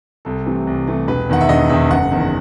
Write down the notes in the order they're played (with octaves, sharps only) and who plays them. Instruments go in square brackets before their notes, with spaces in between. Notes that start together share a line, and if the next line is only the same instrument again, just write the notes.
[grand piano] C2 A4
C3 E3 A3
C2
C3 E3 A3
E1 B4
E2 D#3 F#5
E5
E1 D#5
E2 D#3 E5
F#1 F#5
E2 D#3